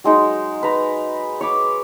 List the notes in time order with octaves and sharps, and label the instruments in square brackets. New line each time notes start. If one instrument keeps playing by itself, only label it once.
[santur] F#3 G#3 D#4
B4 A#5
C#5 B5 D6